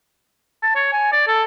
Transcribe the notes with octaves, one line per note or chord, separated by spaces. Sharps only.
A5
C#5
G#5
D5
A4